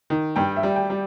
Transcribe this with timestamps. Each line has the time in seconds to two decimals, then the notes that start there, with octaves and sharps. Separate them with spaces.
0.10 D#3
0.36 G2 G5
0.57 E5
0.63 G3
0.76 G5
0.90 G3